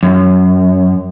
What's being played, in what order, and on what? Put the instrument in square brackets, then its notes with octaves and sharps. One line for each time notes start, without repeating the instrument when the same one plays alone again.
[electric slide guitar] F#2